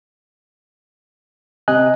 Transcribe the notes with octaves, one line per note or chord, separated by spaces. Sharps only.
C3 D#5 G#5 F#6